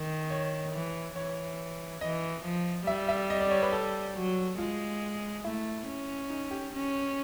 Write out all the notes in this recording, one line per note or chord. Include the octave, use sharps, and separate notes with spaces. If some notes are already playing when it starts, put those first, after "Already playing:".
Already playing: D#3
C#5
E3
E3 C#5
E3 D#5
F3
G3 E5
E5
D#5
D5
C#5
B4
A4
F#3
G#3 F4
A3 E4
C#4
D#4
G4
C#4